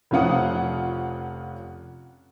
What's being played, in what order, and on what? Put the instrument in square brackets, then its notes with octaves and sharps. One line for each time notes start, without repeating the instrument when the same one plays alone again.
[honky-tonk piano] F1 F3 C#4 F4 F#5 D#6